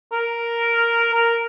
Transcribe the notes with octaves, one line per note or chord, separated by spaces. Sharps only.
A#4
A#4